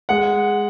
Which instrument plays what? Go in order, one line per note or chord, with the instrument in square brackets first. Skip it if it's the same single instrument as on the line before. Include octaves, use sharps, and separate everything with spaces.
[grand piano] G#3 F#5